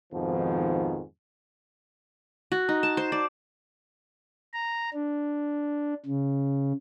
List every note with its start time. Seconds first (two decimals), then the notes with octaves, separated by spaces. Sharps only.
0.13 F2 G#2 B2 D#3 F3
2.52 F#4
2.69 D#4
2.83 A5
2.97 C5
3.12 D5
4.54 A#5
4.94 D4
6.06 C#3